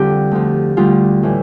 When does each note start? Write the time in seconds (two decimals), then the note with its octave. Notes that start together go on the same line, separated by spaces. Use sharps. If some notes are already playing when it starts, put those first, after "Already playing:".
Already playing: F2 D3 G3 F4 G4
0.31 D2 D3 F3
0.77 D2 D3 G3 F4
1.23 A2 E3 G3